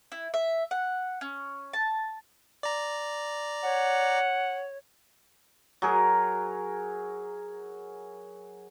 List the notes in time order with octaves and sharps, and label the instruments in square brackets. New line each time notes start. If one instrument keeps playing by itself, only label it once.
[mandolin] E4
E5
F#5
C#4
A5
[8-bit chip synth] D5 A#5
[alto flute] C#5 [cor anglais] F#5
[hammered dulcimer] F#3 G#4 A#4